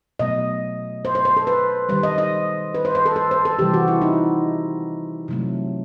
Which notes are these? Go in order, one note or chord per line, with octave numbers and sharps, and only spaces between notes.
B2 F#3 A3 D#5
C5
C5
C5
A4
B4
D#3 G3 C5
D#5
D#5
B4
C5
C5
A4
A4
C5
A4
C3 E3 G3 G4
F#4
E4
D#4
C3 F#3 A3